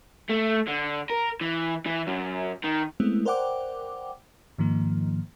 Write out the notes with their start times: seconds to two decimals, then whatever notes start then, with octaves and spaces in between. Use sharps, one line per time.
0.29 A3
0.67 D3
1.10 A#4
1.41 E3
1.86 E3
2.07 F#2
2.64 D#3
3.00 G#3 A3 B3 C4 E4
3.25 A#4 C5 D5 F#5 G5 D6
4.58 G#2 D#3 F3 A#3